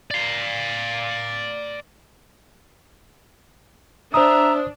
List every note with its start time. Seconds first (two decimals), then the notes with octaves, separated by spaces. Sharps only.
0.11 D5 F5
4.14 D4 C5 E5 A#5 D#6